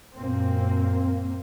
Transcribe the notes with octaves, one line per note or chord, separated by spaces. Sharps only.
F#2 A#2 A#3 C4